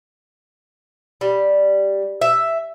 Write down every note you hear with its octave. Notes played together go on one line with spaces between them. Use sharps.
G3
E5